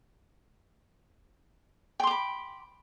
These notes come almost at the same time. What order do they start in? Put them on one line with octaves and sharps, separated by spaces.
G5 C6 D6 B5